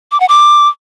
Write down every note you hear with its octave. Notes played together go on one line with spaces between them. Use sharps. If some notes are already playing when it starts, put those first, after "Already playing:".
D6
F#5
D6